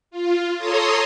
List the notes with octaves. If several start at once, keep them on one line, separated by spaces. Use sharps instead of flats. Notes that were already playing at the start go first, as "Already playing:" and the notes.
F4
A4 C#5 A#5 C6 D#6